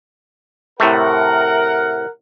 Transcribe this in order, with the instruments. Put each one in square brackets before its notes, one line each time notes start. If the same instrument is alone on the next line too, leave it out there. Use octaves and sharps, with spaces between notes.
[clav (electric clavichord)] A2 C3 A3 [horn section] A#4 F#5